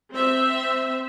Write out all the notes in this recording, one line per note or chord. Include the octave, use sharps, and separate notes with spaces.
C4 E5